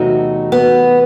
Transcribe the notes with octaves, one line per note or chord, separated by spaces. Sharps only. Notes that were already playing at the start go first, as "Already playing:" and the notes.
Already playing: E2 C3 F#3 A3 D#4 F#4
B3